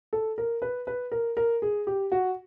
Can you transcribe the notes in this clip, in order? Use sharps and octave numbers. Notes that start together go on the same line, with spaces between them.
A4
A#4
B4
B4
A#4
A#4
G#4
G4
F#4